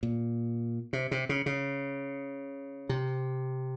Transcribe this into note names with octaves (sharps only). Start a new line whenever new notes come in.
A#2
C3
C3
C#3
C#3
C3